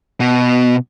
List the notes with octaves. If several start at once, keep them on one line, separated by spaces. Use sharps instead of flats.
B2